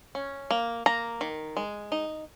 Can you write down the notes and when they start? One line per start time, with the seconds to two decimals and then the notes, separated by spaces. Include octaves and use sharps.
0.15 C#4
0.51 A#3
0.86 A#3 A#5
1.21 D#3
1.57 G#3
1.92 D#4